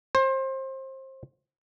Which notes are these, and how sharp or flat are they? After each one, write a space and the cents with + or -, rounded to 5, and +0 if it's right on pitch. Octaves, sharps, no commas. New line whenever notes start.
C5 +25